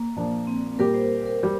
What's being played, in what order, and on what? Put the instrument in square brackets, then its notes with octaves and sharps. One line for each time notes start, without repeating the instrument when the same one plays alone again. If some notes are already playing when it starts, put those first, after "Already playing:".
Already playing: [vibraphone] A#3
[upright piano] A#2 F3 D4
[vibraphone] C4
[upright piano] A#2 G3 A#3 G4 [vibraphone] A#4
[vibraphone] C5
A#4
[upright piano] G3